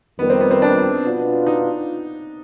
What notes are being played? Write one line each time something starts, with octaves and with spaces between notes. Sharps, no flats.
F2 D#3 G3 B3
C4
B3
C4
D4
B2 B3 D4 F4
D#4